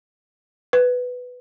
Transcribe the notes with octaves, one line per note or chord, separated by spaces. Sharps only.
B4